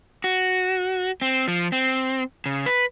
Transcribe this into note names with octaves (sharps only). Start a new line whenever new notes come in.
F#4
C4
F3
C4
C#3
B4